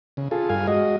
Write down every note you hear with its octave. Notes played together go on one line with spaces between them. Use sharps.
C#3
F4 G#4 A4
G2 F5 G#5
G#3 F#4 D#5